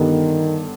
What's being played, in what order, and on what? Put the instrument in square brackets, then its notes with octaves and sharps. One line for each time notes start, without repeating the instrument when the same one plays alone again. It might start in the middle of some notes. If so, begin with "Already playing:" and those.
Already playing: [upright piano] G1 G2 D3 G3 B3 [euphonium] D#3